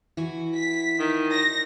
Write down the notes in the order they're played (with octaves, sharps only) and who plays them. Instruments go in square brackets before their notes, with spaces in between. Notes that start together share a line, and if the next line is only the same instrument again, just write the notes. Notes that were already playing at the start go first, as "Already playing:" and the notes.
[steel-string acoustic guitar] E3 E4 F#4
[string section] B6
[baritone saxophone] D#3
[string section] A#6